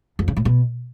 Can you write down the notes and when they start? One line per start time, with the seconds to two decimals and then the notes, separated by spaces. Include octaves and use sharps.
0.19 F2
0.28 C#3
0.37 A2
0.45 B2